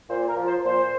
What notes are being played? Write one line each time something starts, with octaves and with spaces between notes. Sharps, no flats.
A#2 C5
A#4
F3
C5
A#2 C5